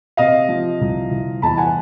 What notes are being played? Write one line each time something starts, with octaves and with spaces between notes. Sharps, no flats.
C3 D#5 F5
F3
C2
C2
E2 A5 B5
F#5 G#5